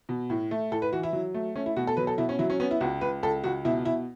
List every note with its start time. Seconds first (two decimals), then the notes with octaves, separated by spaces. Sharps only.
0.09 B2
0.30 A2
0.51 A3
0.72 A2 A4
0.82 B4
0.92 E3 F#4
1.03 E4
1.13 F#3
1.34 A3
1.55 A3 C#4
1.66 E4
1.76 B2 F#4
1.87 A4
1.97 F#3 B4
2.07 A4
2.18 B2 E4
2.29 C#4
2.39 F#3 E4
2.50 C#4
2.60 B3 C#4
2.71 E4
2.81 C#2 F#4
3.01 C#2 B4
3.23 C#2 A4
3.44 C#2 F#4
3.65 B2 E4
3.85 B2 E4